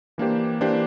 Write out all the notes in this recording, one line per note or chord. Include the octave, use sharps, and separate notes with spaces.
E3 A#3 D4 G4 C5
E3 A#3 D4 G4 C5